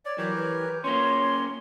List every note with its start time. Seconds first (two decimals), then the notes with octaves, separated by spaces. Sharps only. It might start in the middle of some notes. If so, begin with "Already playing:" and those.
0.05 C#5 D5
0.18 E3 F#3 G4 A#4 C#5
0.36 B4
0.84 A#3 C#4 F4 C#5 C6